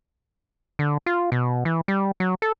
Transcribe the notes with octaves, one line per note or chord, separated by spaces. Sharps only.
D3
F4
B2
E3
G3
F#3
A4